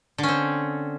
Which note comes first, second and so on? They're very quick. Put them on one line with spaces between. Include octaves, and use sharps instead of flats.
D3 C#4 C4